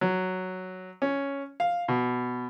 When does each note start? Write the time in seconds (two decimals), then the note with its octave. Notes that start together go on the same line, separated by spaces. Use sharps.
0.01 F#3
1.02 C#4
1.60 F5
1.88 B2